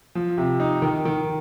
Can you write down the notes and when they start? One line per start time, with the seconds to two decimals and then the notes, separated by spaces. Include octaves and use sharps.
0.15 F3
0.38 C3
0.60 D#4
0.82 D#3
1.05 D#3